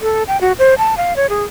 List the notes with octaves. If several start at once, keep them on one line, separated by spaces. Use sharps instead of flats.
A4
G5
F#4
C5
A5
F5
C#5
G#4